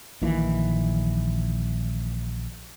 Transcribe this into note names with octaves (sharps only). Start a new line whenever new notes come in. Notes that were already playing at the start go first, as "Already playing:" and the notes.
A#1 A#2 D#3 E3